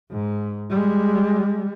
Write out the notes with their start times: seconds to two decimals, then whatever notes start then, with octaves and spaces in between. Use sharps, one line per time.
0.12 G#2
0.70 G3 G#3